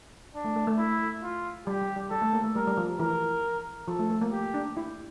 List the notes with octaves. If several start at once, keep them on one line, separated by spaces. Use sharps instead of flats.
D4
A3
A3
A3
E4
F4
G3 G4
G3
G3
G3 A4
A3
A#3
A3
G3 A#4
G3
F3
E3 A#4
F3 A4
A3
A3
A#3
G4
D4
E4